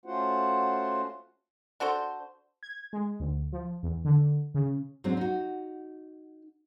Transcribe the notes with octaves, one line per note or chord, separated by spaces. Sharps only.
A3 C#4 F4 F#4 C5 F#5
D4 F#4 A4 C5
G#6
G#3
D2
F3
E2
D3
C#3
G#2 F#3 G#3 C4 D4
D#4 F#4